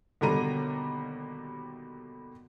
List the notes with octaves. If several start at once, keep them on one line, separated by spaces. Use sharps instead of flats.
D#2 B2 D3 G3 A#5 D#7